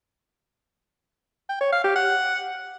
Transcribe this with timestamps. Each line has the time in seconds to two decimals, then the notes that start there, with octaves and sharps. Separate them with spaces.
1.49 G5
1.61 C#5
1.72 F5
1.84 G4
1.96 F#5